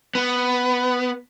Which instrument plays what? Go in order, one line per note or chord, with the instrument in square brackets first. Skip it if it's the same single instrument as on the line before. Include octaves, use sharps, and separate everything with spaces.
[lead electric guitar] B3